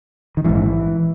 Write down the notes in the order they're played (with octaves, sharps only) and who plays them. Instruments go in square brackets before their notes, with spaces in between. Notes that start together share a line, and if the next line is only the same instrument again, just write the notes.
[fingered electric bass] D#3
A#1 G#2 E3